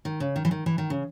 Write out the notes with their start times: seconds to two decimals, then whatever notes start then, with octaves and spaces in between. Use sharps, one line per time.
0.05 D#3
0.20 C#3
0.36 D#3
0.45 E3
0.51 D#3
0.66 E3
0.78 D#3
0.90 C#3